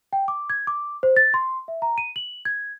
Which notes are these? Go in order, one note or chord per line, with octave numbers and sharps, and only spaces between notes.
G5
D6
G#6
D6
C5
A6
C6
E5
A#5
D#7
F#7
G#6